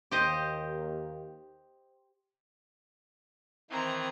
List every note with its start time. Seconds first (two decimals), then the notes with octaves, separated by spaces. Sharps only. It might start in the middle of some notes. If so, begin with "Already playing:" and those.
0.11 D#2 G4 C5 D#5
3.70 D#3 E3 C4 A#5